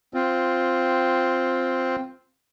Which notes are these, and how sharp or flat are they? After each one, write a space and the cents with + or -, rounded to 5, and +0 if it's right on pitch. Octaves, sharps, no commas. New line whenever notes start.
C4 +0 F4 +5